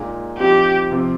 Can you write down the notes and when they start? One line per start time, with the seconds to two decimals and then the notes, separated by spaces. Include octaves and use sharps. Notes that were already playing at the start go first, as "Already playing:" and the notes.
Already playing: A#2 G#3 D#4
0.38 F3 C4 D#4 G4
0.91 C3 F3 C4 F4